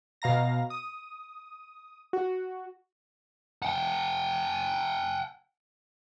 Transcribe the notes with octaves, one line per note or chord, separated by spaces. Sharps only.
B2 F5 A#5 A#6
D#6
F#4
F#5 G5